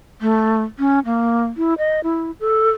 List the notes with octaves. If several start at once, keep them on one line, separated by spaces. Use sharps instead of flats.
A3
C#4
A#3
E4
D#5
E4
A4